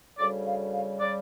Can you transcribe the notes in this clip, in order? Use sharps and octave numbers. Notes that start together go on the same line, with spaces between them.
D2 C#3 G3 D5
F5
F5
C#3 G3 D5